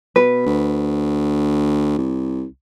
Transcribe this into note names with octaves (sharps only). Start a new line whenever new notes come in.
B2 B4
D2
C2